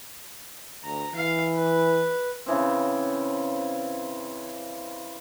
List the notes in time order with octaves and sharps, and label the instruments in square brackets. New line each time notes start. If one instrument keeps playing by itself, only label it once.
[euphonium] D2 [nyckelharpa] A#5
[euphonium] E3 [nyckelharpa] F5
[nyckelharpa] B4
[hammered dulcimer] C#3 E3 C4